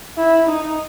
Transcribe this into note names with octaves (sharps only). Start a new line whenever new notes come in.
E4
D#4